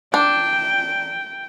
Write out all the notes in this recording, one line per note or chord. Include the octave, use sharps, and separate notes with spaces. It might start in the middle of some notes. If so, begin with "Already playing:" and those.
D4 G5